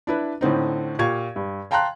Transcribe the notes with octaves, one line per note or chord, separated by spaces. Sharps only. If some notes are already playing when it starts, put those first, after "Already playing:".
D4 E4 B4
A2 D3 C4 D#4
A#2 G4 F5 C#6 G#6
G2
F5 G5 A5 A#5 C6 F#6